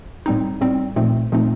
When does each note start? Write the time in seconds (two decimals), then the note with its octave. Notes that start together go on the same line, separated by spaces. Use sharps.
0.26 A2 G3 C4 D#4
0.61 A2 G3 C4 D#4
0.96 A#2 F3 A3 C4 D#4
1.32 A#2 F3 A3 C4 D#4